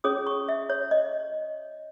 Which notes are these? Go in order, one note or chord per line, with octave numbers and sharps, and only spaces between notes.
C#4 G#4 C#5 D#6
C#6
E5
C#5
D#5